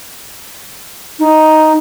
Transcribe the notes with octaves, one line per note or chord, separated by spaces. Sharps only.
D#4